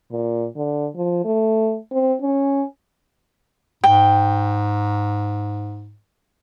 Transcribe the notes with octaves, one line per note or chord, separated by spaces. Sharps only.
A#2
D3
F3
A3
C4
C#4
G#2 G5